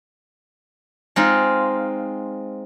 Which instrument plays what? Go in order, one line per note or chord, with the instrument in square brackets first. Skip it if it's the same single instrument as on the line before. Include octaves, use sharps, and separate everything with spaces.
[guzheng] G#3 C4 D#4 F4